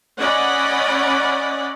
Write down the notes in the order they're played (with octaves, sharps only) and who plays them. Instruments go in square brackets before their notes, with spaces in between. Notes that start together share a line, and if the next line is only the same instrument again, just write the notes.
[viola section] C#4 D5 D#5 F#5 B5